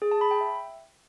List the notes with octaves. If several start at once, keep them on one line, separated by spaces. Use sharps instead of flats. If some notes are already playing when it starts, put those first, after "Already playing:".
G#4
A5
B5
G5
E5